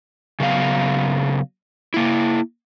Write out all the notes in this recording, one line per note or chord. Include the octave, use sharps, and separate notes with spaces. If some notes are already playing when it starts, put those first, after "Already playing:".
C#3 F#3 B3 F5
A#3 E4